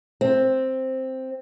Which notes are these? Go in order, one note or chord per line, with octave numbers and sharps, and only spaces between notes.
C4